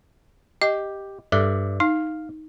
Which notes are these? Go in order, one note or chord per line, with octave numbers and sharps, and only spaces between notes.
G4 D#5
G2 A4 D5 E5
D#4 F5